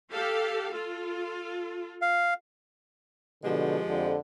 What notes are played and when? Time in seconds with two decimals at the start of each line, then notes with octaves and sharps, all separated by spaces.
0.13 G4 A4 F5
0.73 F4 A4
2.02 F5
3.44 B2 D3 F3 G#3 G4
3.89 F2 D3